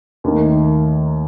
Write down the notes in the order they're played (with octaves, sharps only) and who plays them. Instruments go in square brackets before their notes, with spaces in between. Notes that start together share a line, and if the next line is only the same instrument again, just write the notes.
[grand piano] D#2 D#3 A3 D#4 A#4